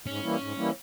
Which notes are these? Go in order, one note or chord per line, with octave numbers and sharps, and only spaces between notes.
G#2 C#4
E3 G3 A#3 E4
G#2
E3 G3 A#3 E4